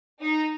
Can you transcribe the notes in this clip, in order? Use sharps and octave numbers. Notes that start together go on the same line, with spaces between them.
D#4